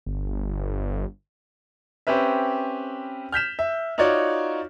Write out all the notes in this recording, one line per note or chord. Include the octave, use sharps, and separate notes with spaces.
G1
C4 C#4 G4 B4 E5
F6 G6 B6 E7
E5
D#4 F4 F#4 C#5 D5